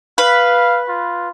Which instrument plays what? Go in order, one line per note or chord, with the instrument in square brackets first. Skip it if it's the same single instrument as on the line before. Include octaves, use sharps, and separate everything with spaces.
[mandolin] B4 [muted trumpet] F5
[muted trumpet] F4